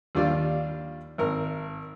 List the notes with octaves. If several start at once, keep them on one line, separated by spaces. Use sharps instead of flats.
D#2 G3 D4 F4 D5
G#1 A#4